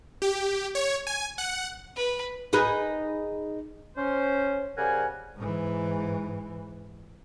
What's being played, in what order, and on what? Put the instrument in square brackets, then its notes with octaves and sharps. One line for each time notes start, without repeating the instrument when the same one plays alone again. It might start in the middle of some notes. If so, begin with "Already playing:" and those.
[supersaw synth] G4
C#5
G#5
F#5
[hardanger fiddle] B4
[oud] D#4 G#4 B4
[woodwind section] C#4 C5
C#3 G3 A#4 C5 F#5 G#5
[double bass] G#2 E3